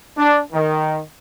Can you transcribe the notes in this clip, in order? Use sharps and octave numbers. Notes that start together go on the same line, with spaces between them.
D4
D#3